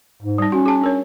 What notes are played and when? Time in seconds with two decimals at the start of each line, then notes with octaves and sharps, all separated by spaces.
0.22 G#2
0.38 G3 D#4
0.52 C#4 F#4
0.66 G#4 A5
0.81 D4 A#4 C#5